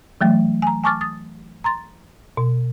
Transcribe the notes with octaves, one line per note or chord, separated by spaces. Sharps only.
E3 F#3 A3
G#5 A#5
G#5 A5 C#6 D6 F6 A6
D#6 A6
A#5 C6 A6
B2